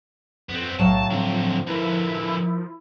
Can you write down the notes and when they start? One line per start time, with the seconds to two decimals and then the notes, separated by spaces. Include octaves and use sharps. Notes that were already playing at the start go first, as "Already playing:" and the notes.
0.49 F2 B3 C4
0.79 B1 A2 F#3 F5 A5
1.11 D3 F3 C4
1.67 D3 E3 D#4 E4 A#4